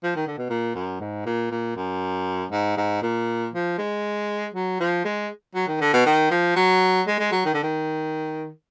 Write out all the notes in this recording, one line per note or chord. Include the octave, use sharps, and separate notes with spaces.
F3
D#3
D3
B2
A#2
F#2
G#2
A#2
A#2
F#2
G#2
G#2
A#2
F3
G#3
F#3
F3
G#3
F#3
D#3
D3
B2
D#3
F3
F#3
G#3
G#3
F#3
D#3
D3
D#3